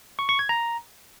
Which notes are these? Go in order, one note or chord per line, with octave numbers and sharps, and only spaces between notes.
C#6
C#6
G#6
A#5